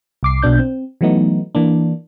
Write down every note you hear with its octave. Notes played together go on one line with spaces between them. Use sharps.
C2 D6 C7
B1 B2 D4 G6
C4
E3 F#3 A3 B3 D#4
E3 A#3 D4